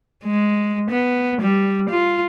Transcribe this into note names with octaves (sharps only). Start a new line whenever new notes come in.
G#3
B3
G3
F4